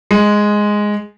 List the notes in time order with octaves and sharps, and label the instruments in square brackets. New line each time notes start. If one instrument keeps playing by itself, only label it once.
[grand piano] G#3